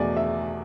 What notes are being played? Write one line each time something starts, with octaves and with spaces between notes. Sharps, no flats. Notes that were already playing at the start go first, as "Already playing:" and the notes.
Already playing: E1 E2 B2 A3 D5 G#5
E5